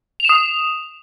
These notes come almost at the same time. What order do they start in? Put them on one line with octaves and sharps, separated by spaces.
F7 E7 D#6